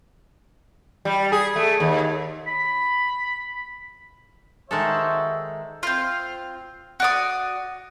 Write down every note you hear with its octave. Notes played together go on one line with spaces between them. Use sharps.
G3
G#4
A3
D#2
B5
D#3 G#3 F#4 A4 C5 E5
C4 F4
F#4 D5 D#6